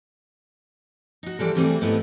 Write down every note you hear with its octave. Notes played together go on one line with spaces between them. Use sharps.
D#4 F#4
E3 G3 G#3 A4
C3 E3 G3 A3 C4 G#4
G#2 A3 B3 E4 D#5